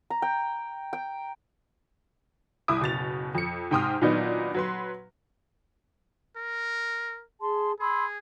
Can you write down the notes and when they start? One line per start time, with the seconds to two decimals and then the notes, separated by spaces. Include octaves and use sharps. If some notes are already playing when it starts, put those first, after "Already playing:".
0.10 A#5
0.22 G5
0.93 G5
2.68 C2 E4 D6 D#6
2.81 F#1 B2 A6 F7
3.35 F2 C#7
3.71 G#2 C3 G5 C6 D#6 F6
4.02 A#2 D#3 F#3 B3 D4 D#4
4.54 F#3 B4 C6
6.36 A#4
7.40 G#4 A5 C6
7.79 G#4 B5 C6 E6